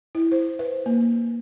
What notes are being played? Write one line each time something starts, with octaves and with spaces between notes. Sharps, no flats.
E4
C5
B4
A#3